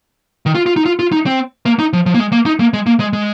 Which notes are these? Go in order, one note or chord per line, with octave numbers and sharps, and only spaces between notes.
D#3
F4
F4
D#4
F4
F4
D#4
C4
A#3
D#4
F3
F3
A#3
G#3
A#3
D#4
A#3
G#3
A#3
G#3
G#3